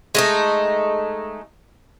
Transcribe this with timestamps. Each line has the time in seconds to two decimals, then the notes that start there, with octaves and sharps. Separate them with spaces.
0.15 G#3 A3 D#4